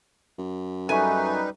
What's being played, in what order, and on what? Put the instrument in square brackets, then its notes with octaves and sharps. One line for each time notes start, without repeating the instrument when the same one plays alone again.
[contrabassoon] F#2
[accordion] G3 D#4 B4 [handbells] A4 E5 C#6 [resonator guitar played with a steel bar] G#5